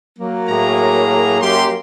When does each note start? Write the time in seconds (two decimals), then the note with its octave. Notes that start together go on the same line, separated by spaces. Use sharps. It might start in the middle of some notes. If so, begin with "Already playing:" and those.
0.18 F#3 A#3
0.48 A2 G#4 A#5
1.41 F#2 G4 C6